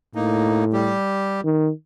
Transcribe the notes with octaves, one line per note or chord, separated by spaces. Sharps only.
A2 A#3 D#4
G3 G4
D#3